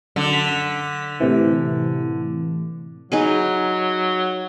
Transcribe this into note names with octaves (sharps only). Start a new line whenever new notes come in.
F#2 D3
B6
A2 C3 E3
F#3 D#4 G#4 B4